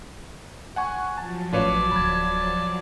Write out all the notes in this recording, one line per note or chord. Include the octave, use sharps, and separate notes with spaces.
F#5 G#5 C#6
F3 F#3 A5
A1 F4 B4 C#5 D5 A5
D1 B5 G#6